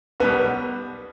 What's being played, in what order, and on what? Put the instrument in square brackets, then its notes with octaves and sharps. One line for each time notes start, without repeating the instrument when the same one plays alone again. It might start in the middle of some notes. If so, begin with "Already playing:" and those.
[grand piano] B1 B2 G3 B3